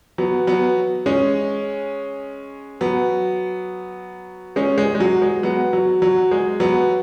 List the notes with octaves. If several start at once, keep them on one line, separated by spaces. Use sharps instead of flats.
F#3 B3
F#3 B3
G#3 C#4
F#3 B3
G#3 C#4
G#3
G#3
F#3
G#3
F#3 B3
F#3
F#3
G#3
F#3 B3